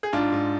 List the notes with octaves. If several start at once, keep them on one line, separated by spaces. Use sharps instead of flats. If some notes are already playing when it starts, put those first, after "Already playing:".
G#4
G#2 D4 F4
G#2